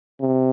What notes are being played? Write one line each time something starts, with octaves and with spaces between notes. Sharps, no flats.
C3